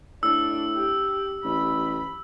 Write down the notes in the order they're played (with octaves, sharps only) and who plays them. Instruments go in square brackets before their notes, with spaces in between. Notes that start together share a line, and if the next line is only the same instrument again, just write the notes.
[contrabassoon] A2 [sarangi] D4 [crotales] E6
[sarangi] G4
[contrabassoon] A1 [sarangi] B5